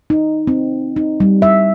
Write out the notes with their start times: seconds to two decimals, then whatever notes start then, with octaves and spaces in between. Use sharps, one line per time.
0.10 D#4
0.47 C4
0.96 D#4
1.20 G3
1.42 E5